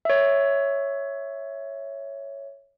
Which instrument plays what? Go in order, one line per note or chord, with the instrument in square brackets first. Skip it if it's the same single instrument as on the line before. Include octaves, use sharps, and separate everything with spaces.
[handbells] C#5 E5